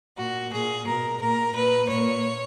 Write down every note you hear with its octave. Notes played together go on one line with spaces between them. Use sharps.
A#2 F#4
A#2 G#4
B2 A#4
A#2 A#4
A#2 B4
A#2 C#5